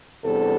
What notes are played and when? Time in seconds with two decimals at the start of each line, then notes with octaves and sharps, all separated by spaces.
0.24 E2 C3 G3 B3 D4 A4